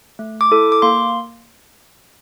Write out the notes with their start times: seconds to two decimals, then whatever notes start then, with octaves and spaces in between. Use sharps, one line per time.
0.19 A3
0.41 D6
0.51 E4 A4
0.72 D6
0.82 A#3 C6